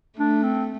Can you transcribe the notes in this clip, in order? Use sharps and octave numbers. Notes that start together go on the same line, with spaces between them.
A3 D4
C4